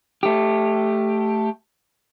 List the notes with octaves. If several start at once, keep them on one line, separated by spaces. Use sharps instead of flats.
A3 G4